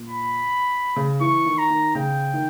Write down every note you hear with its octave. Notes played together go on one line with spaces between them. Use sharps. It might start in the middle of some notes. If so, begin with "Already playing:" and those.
Already playing: A#2
B5
C#3
E3 C#6
D#3
A#5
D#3
C#3 G5
D#3